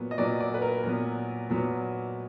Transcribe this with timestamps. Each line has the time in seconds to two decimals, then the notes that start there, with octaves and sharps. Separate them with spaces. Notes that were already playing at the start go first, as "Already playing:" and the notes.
Already playing: A#2 F#3 B3
0.11 D#5
0.18 A#2 F#3 B3 D5
0.40 D5
0.54 B4
0.62 A#4
0.84 A#2 F#3 B3
1.50 A#2 F#3 B3